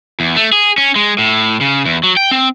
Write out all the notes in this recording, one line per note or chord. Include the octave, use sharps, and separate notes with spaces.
E2
A3
G#4
C#4
G#3
A2
C#3
E2
F#3
G5
C4